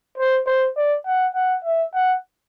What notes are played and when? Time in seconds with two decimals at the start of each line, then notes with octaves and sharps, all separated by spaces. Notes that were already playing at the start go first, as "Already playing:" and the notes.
0.18 C5
0.47 C5
0.77 D5
1.06 F#5
1.35 F#5
1.65 E5
1.94 F#5